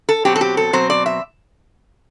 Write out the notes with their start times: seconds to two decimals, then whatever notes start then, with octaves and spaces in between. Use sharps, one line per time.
0.09 A4
0.25 B2 F#3 C4 G4
0.36 A4
0.41 G4
0.57 A4
0.73 B2 F#3 C4 C5
0.90 D5
1.06 E5